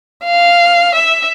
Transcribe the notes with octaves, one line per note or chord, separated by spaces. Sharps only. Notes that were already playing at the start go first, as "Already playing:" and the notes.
F5
E5